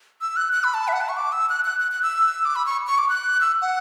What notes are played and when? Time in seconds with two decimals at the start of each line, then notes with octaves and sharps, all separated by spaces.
0.21 E6
0.37 F#6
0.53 F#6
0.64 B5
0.74 A5
0.88 E5
0.93 F#5
1.01 A5
1.09 C#6
1.17 D6
1.32 E6
1.49 F#6
1.65 F#6
1.80 F#6
1.92 F#6
2.03 E6
2.45 D6
2.56 B5
2.66 C#6
2.87 C#6
2.98 D6
3.09 F#6
3.41 E6
3.62 F#5